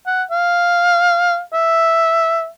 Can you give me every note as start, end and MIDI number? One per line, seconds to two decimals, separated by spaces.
0.07 0.23 78
0.31 1.40 77
1.53 2.48 76